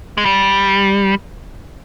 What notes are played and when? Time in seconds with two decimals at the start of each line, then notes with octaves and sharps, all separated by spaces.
0.18 G#3
0.25 G3